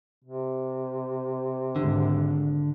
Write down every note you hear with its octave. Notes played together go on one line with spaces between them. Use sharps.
C3
G#1 D2 D3